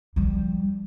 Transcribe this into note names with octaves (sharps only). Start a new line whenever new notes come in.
F3 G3